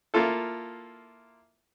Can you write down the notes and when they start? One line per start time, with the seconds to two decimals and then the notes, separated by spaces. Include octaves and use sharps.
0.14 A#3 E4 F4 A4